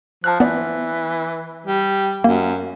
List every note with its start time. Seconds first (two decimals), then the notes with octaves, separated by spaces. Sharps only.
0.24 F3 A5 F6 F#6
0.40 E3 B3 D5
1.67 G3
2.24 F#2 A#3